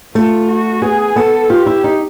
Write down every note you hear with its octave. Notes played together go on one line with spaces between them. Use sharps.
A3 F4
F#4
B3 G#4
B3 A4
F4 G4
E4
D#4